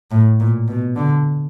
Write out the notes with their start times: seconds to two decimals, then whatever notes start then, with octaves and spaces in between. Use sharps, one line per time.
0.11 A2
0.40 A#2
0.68 B2
0.96 D3